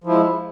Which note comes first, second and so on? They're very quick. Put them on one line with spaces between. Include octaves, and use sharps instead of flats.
F3 E4 G#3